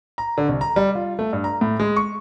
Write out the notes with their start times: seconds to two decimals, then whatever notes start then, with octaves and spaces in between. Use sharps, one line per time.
0.18 A#5
0.37 D3
0.49 C2
0.61 A#5
0.76 G3
0.95 F4
1.19 A3
1.33 G2
1.44 A#5
1.61 A2
1.80 G#3
1.96 C#6